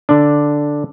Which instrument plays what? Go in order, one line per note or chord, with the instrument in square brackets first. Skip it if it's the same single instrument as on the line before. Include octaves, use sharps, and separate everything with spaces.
[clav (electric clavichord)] D3 D4